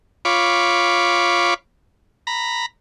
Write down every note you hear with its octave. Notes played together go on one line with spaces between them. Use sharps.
F4 C#5 B5 D6
A#5 B5